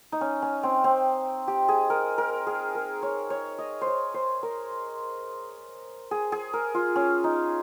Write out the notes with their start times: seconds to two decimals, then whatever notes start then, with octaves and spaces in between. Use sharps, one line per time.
0.12 D#4
0.21 C#4
0.42 C#4
0.63 C4
0.84 C4
1.48 G4
1.68 G#4
1.90 A#4
2.18 A#4
2.47 G#4
2.75 A#4
3.02 C#5
3.30 C#5
3.58 D#5
3.81 C5
3.87 C#5
4.14 C5
4.43 A#4
6.11 G#4
6.32 G#4
6.53 A#4
6.74 F4
6.96 C#4
7.24 D#4